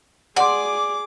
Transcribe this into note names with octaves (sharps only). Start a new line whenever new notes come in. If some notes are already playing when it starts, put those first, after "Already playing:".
G#4 D5 F#5 C6 D6